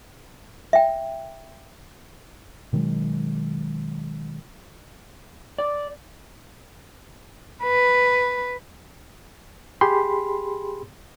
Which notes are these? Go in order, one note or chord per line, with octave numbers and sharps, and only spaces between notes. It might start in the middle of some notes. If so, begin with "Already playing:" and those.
E5 G5
B2 D#3 F#3 G#3
D5
B4
G4 G#4 B5 C6